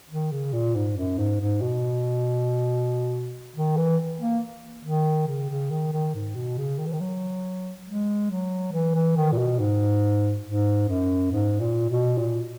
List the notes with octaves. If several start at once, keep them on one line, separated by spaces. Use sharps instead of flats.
D#3
C#3
A#2
G#2
F#2
G#2
G#2
B2
D#3
E3
A#3
D#3
C#3
C#3
D#3
D#3
G#2
B2
C#3
D#3
E3
D#3
F#3
G#3
F#3
E3
E3
D#3
A#2
B2
G#2
G#2
F#2
G#2
A#2
B2
A#2